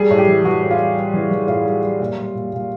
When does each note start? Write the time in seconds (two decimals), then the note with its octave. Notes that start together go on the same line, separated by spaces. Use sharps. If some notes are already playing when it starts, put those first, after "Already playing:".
Already playing: G3 G#4
0.10 A2
0.18 G4
0.27 E3
0.44 E3 F#4
0.62 A2
0.71 F4
0.79 G3
0.97 G3
1.14 E3
1.31 E3
1.48 A2 F4
1.65 G3
1.82 G3
2.00 A#2
2.18 G3
2.35 A#2
2.53 A#2